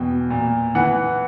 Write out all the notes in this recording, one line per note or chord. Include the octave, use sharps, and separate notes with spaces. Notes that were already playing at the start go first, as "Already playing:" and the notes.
Already playing: E2 B2 G5
A#2
E3 F#5